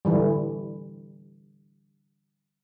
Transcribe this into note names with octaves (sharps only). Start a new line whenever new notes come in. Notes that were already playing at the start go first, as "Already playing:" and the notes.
D3 E3 G3